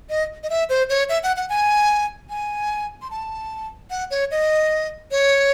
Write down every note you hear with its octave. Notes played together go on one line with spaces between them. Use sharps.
D#5
D#5
E5
C5
C#5
E5
F#5
F#5
G#5
G#5
C6
A5
F#5
C#5
D#5
C#5